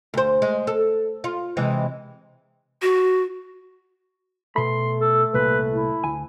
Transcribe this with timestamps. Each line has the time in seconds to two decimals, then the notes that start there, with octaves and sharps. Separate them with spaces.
0.14 D2 C5
0.42 G#3
0.67 A4
1.24 F4
1.57 C3 E3 G#3
2.82 F#4
4.56 B2 A3 B5 C6
5.00 A4
5.34 C2 A#2 B4
5.72 E4
6.04 D2 G#5